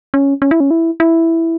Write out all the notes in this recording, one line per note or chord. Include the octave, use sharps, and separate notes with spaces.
C#4
C#4
E4
C#4
E4
E4